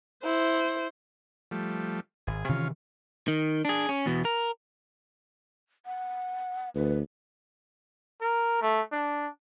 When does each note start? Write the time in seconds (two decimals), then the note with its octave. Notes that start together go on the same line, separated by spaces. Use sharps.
0.25 E4 C5
1.51 F3 G3 A3
2.27 G#1 G#4
2.49 C3 D#3 E3 C#4 F4
3.28 D#3
3.65 D4 G#4
3.89 C#4
4.06 E2 B2
4.25 A#4
5.86 F#5
6.75 D2 B4
8.21 A#4
8.61 A3
8.92 D4